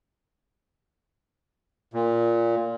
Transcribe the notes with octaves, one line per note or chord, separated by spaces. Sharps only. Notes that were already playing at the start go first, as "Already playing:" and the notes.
A#2